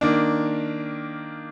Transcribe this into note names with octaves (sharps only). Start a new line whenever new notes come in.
D#3 A#3 D4